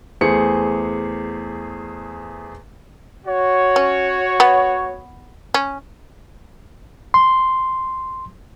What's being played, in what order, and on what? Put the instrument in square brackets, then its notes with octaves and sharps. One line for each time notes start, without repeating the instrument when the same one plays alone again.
[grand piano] E2 A3 G#4 C5 C#7
[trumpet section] F#4 C#5
[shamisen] C#4
B3
C#4
[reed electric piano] C6